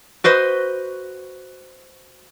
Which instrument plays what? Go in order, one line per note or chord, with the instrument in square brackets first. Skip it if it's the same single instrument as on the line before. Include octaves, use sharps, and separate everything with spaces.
[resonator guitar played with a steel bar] F#4 B4 C5 D#5